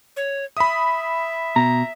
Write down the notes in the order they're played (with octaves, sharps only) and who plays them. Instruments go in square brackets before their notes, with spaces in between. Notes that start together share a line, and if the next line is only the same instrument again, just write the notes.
[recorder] C#5
[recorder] E5 [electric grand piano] B5 D#6
[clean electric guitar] B2 [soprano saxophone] A#5